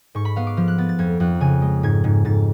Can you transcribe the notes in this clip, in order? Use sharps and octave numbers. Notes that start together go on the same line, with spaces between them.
G#2 C#6
B5
B3 F5
D6
F3 F6
F#6
B3 A6
A6
F2 G#6
F2 F#6
C#3 G#5
G#3
G#2 G#6
G#2
G#2 A6